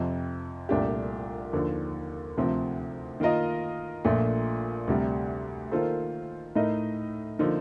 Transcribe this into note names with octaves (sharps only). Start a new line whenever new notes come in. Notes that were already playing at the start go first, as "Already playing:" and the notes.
Already playing: F2 C3 F3
C2 A#2 A3 D4 G4
D#2 D3 F3
D2 C3 F3 C4
D#3 A#3 F4 A#4 D#5
A#1 A#2 A3
D2 C3 G3
D#3 A#3 F4 A4 C5
A2 A3 D#4 A#4 D#5
D3 F3 A#3 D#4